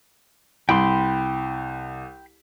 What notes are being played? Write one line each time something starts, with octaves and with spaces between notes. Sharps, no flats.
C2 G5 B5 C6